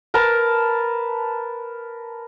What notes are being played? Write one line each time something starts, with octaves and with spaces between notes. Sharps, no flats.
A#4 B4 A5